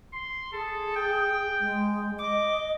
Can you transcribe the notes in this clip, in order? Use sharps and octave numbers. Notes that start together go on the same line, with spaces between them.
C6
G#4 A4
G5
G#3
D#5 D6